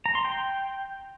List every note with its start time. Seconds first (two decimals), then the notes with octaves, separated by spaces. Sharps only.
0.06 A#5
0.15 C6
0.25 G5